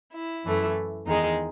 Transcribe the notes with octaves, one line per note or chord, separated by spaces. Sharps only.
E4
F#2 E3 A3
E2 D#3 G#3 D#4